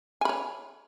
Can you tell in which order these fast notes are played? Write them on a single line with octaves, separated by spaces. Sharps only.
G#5 B5 C#5